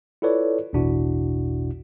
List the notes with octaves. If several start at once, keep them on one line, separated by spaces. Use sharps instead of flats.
E4 F4 A4 B4 C#5 D5
A1 E2 B2 D4 E4 F#4